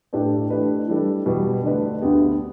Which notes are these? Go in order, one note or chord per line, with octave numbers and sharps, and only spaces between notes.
A2 A3 D4 G4 B4
E3 A3 D4 G4 B4
E3 G3 D4 A4
E2 B2 G3
D3 A3 D4 B4
D2 D3 B3 G4